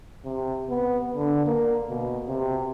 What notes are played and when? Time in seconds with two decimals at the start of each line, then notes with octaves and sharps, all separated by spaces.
0.25 C3
0.70 B3
1.16 D3
1.46 A#3
1.89 B2
2.27 C3